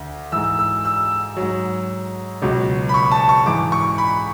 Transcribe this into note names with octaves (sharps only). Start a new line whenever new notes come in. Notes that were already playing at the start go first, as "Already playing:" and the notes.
Already playing: D2
G#2 E3 E6
E6
E6
G#2 F#3
C#2 B2 F#3
B5
C#6
A5
C#6
G#2 E3 D6
C#6
B5